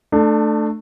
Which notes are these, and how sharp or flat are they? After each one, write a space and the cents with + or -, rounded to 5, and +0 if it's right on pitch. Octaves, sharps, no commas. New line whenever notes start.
A3 +0 D4 +25